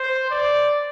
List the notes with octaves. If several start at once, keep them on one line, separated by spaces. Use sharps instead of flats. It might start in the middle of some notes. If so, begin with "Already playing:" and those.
Already playing: C5
D5